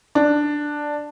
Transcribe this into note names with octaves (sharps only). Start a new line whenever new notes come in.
D4